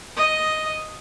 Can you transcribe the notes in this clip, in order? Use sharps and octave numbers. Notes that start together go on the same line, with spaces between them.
D#5